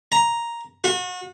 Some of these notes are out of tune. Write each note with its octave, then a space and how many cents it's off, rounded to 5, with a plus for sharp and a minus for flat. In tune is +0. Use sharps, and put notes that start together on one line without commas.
A#5 +5
F#4 -35